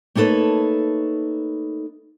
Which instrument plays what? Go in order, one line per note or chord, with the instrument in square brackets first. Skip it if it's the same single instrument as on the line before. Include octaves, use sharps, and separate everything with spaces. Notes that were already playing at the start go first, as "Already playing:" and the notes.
[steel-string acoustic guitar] A3 A#3 D#4 A4 B4 C#5